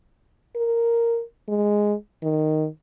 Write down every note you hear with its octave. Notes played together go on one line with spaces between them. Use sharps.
A#4
G#3
D#3